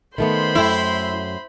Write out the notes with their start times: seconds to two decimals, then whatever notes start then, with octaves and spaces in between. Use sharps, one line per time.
0.18 D#3 A3 B3 C5 B5 C6
0.55 F#2 A3 E4 G5